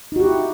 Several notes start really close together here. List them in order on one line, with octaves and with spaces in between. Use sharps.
D#4 F#4 G4 E4